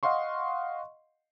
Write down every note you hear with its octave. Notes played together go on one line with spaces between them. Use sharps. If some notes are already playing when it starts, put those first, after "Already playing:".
D#5 F5 F#5 C6 C#6